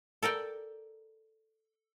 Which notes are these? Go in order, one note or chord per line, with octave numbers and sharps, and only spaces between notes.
A4 A#4 D5 G5